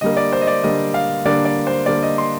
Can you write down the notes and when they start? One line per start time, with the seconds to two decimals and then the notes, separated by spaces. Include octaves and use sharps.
0.01 D3 G3 A#3 D#5
0.17 D5
0.33 C5
0.41 D#5
0.47 D5
0.64 D3 G3 A#3 D#5
0.94 F5
1.25 D3 G3 A#3 D5
1.45 D5
1.67 C5
1.86 D3 G3 A#3 D5
2.03 D#5
2.18 C6